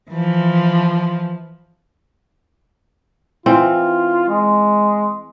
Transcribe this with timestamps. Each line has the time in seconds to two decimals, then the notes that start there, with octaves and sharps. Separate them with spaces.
0.10 E3 F3
3.46 E3 C4 F4
4.29 G#3